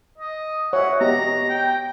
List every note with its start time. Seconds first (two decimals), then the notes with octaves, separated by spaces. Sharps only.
0.18 D#5
0.73 C#5 E5 F#5
1.01 B3 G4 D#5 A#5
1.49 G5